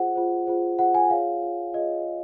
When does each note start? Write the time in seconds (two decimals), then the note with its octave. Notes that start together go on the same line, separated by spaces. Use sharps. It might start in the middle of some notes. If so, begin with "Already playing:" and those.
Already playing: F4 G#4 C5 F#5
0.15 F4 G#4 C5
0.47 F4 G#4 C5
0.79 F4 G#4 C5 F#5
0.95 G#5
1.10 F4 G#4 C#5 F5
1.42 F4 G#4 C#5
1.73 F4 G#4 C#5 D#5
2.05 F4 G#4 C#5